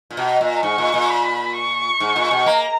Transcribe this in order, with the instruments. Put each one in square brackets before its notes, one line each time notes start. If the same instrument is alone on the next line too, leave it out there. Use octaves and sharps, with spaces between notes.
[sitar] A#2
[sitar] B2 [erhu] A#5
[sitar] A#2
[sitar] G#2 [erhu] C#6
[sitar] A#2
A#2
[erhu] B5
C#6
[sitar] G#2
A#2
B2
[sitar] A#3 [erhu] A#5